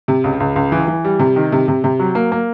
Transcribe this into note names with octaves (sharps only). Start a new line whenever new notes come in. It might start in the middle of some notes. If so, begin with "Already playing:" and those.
C3
C#2
C#2
C#2
E3
E3
G3
C3
D#3
C3
C3
C3
F#3
A#3
A#3